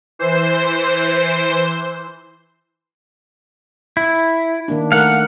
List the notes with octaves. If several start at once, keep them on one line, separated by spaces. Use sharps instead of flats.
E3 C5
E4
D#3 A#3 D4
A3 A#4 F5 F#5